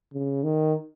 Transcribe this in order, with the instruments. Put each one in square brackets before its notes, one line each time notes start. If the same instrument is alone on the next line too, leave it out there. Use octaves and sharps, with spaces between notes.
[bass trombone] C#3
D#3